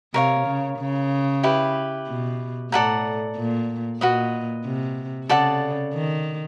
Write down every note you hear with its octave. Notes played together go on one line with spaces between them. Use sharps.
C3 A#4 C#5 F5
C#3
C#3
E4 G4 B4
B2
A2 A4 D5 F#5 A#5
A#2
A#2 F#4 B4 D#5
C3
C#3 A4 D5 F#5 A5
D#3